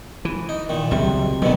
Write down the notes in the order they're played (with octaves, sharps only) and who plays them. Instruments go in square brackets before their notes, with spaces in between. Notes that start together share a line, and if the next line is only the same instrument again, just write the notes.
[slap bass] E3
[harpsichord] D#4
A#2 D#3
[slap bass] C#2 F#3 G3 [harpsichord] C3
[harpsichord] B2 D3 D#3 [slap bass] F#3 B3